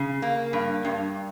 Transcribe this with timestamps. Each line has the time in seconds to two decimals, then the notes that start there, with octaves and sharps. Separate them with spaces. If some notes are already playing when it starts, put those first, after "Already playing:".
Already playing: C#3
0.22 A#3
0.53 G2
0.85 G2